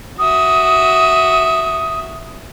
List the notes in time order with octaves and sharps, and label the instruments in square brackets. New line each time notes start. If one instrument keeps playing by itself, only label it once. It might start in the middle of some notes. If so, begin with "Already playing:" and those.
[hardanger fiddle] F#4 E5 [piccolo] D#6